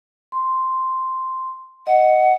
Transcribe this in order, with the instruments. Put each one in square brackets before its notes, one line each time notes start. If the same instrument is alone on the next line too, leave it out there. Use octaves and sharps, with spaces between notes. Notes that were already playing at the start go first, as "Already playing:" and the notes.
[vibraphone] C6
[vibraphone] D#5 [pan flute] F#5